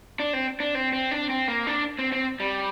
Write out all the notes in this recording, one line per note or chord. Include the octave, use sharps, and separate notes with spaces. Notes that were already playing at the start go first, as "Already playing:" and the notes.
D4
C4
D4
C4
C4
D4
C4
A#3
D4
C4
C4
G3